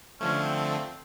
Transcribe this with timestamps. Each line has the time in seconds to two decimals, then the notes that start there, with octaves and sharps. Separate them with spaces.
0.21 D3 F3 A3 C#4
0.43 C4